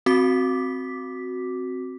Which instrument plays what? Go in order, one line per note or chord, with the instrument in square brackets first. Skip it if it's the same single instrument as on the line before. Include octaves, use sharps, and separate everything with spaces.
[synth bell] C4 F#4 D6 B6